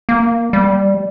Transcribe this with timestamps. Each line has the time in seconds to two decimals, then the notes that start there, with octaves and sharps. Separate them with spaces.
0.09 A#3
0.53 G3